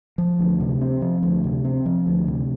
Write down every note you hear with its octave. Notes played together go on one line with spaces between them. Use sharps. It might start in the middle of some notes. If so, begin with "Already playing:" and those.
F3
D2
C3
C4
F3
D2
C3
C4
F3
D2
C3